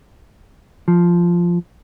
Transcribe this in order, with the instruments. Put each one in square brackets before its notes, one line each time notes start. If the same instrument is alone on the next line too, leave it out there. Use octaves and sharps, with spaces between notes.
[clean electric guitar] F3